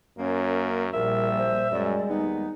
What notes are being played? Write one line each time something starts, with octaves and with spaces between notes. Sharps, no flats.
F#2 A#3 C#4
A#1 A#2 G3 A#4 E5
C5
F#2 G3 G#3 D5
D#2 B3 D#4